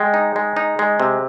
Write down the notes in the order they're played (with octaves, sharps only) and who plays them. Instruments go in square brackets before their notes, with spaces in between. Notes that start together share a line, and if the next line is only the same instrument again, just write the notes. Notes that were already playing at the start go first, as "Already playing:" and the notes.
Already playing: [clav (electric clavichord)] G#3 [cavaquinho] G5
[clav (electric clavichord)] D#4
G#3
D#4
G#3
C3